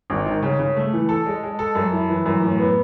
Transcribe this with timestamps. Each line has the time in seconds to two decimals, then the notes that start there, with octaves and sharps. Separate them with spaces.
0.10 G#1
0.26 D#3
0.43 C#3
0.59 C#3
0.77 A3
0.93 E3
1.09 A4
1.26 G#3
1.43 G#3
1.59 A4
1.75 F#2
1.92 E4
2.09 E3
2.26 F#2
2.42 A2
2.58 B3